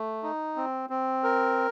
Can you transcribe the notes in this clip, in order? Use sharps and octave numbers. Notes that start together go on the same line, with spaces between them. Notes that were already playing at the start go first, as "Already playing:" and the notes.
Already playing: A3
D#4
C4
C4
A#4